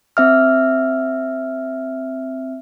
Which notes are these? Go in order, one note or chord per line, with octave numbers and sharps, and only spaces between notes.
C4 E5 F6